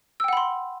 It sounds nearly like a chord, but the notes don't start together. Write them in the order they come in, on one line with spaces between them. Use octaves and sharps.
E6 G5 F#5 B5 C6